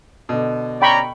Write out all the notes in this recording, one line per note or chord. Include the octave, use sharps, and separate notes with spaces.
B2 D3
C#4 D5 G5 A#5 B5 C#6